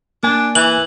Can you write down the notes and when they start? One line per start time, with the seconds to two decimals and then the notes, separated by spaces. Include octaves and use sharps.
0.23 A#3 D4 G#5
0.55 E3 F#7